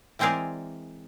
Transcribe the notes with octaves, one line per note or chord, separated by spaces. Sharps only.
E3 G#3 C4 G#4 A#4 D5